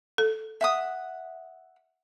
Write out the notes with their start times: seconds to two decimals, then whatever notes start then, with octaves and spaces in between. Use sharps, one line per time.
0.18 A4
0.61 E5 F#5 D#6